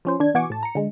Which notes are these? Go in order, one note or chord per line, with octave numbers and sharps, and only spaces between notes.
F3 C#4 C5
D#3 D4 G#6
B2 E3 F#4 G#5 C#6 D6
A2 A5
A#5 C#7
D3 G#3